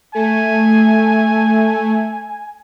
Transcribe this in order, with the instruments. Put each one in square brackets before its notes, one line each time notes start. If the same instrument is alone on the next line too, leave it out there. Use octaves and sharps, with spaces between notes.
[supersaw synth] A3 [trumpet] G#5